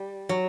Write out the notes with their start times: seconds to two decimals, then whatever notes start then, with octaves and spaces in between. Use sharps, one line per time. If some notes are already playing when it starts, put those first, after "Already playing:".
Already playing: G3
0.29 F#3